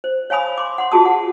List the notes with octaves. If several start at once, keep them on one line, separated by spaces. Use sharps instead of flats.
C5
C#5 F5 G#5 B5 D#6
C6 D6
F#5 C6
F4 F#4 G#4 A5 D#6
F#5